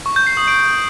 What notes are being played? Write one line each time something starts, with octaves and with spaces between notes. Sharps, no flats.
C#6
G6
C7
D#6
D7